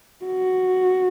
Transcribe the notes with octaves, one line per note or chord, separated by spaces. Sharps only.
F#4